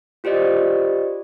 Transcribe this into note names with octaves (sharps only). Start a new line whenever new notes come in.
F4 G4 C5 D5 D#5